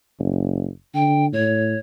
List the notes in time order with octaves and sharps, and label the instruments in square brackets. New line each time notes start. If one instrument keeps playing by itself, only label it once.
[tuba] F#1
[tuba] D3 [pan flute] G5
[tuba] A2 [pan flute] C#5